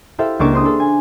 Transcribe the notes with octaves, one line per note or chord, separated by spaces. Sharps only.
E4 G4 A4 C5 E5 F5
C#2 A#3 D4 C#6 D6 E7
C5 C6 D#6
D4 A4
G#5